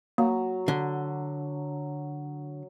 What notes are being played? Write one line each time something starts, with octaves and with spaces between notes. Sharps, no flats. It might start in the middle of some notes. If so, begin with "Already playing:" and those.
F#3 A#3
D3